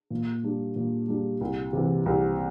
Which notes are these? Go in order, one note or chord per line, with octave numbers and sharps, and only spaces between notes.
A#2
G3 D4
A#2
G3 D4
C2
C3 E3
C2